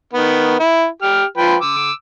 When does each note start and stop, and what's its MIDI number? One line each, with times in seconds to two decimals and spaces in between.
0.13 0.56 51
0.13 0.56 59
0.59 0.86 64
1.02 1.24 67
1.02 1.24 89
1.37 1.55 53
1.37 1.55 71
1.37 1.55 79
1.61 1.92 86
1.61 1.92 88